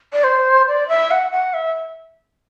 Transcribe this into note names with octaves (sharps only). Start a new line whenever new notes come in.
D5
C5
D5
E5
F#5
F#5
E5